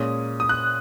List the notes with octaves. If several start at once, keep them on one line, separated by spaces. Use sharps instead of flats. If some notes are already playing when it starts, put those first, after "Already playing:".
Already playing: A#2 G#3 C#4 D#6
D#6
F#6